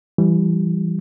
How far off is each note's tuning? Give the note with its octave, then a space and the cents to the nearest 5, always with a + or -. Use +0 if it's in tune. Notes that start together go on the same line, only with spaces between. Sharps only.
E3 +25 G3 +0